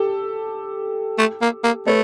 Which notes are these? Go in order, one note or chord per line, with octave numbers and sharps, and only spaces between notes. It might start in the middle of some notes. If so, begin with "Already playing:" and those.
Already playing: G4 A4
A3
A#3
A#3
A3 B4 C#5